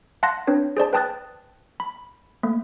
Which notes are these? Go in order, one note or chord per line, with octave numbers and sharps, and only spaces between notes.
F5 F#5 A5 C6 F#6 A#6
C4 D4 B4 C#5
G#4 C5 D5 A5
B4 G5 A5 D#6 F#6 A6
B5
A3 A#3